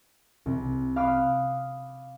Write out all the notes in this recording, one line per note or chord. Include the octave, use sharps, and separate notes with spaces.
C2
F5 B5 D6 D#6 F6 F#6